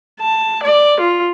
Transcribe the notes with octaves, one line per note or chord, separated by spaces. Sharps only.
A5
D5
F4